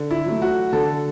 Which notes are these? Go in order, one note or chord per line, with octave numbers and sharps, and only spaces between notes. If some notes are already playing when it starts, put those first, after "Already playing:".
Already playing: D3
E4
F#3 A3
F#4
D3 A4